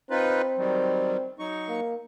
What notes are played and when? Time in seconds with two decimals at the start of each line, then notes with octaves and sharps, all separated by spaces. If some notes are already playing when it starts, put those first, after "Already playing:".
0.10 C4 D#4 F4 B4
0.58 D#3 F#3 G3
1.39 F#3 D#4 C#6
1.68 A#3